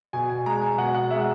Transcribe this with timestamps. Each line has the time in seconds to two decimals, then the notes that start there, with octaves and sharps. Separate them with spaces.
0.13 B2 G#5
0.29 G#5
0.46 G#3 A#5
0.62 G#5
0.78 B2 F#5
0.94 F#5
1.11 G#3 E5